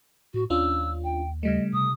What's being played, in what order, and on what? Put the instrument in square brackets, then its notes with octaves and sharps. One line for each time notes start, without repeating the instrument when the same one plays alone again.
[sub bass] A2 [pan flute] F#4
[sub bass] D#2 [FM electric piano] C#4 D4 F4 [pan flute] E6
[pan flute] G5
[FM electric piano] C#3 G3 A3 [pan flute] D#5
[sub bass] C3 [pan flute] D#6